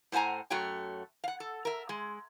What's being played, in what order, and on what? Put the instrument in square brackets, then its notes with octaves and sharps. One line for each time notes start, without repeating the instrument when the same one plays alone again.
[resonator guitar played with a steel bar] A2 C5 F#5 G#5 A#5
F#2 A3 F#4 C#5 G5
F5 F#5
A4
A#4 E5
G#3